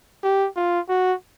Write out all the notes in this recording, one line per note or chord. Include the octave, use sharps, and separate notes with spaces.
G4
F4
F#4